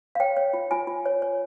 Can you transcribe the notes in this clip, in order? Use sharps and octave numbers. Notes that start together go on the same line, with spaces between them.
F5
C#5 G5
C#5
F4
F4 G#5
F4
C#5
C#5